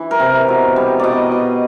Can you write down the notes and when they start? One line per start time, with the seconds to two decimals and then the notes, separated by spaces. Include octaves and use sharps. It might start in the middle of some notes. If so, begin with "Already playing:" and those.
Already playing: E3
0.11 A#4
0.20 C3
0.49 B2
0.76 G3
0.99 B2 D5 D#5
1.31 B2